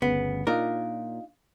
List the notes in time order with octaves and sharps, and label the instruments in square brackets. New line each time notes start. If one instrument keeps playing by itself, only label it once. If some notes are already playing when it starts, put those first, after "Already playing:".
[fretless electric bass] G1 D2 C#3 [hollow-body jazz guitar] B3
[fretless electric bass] A#2 [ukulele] D4 D#4 F4 [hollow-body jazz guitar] A#4